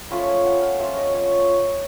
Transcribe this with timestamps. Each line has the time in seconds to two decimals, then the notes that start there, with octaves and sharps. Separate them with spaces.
0.11 F3 A3 C#4 F4 B5
0.28 G#5
0.45 F#5
0.62 F5
0.80 F3 A3 C#4 F4 E5
0.97 D#5
1.14 C#5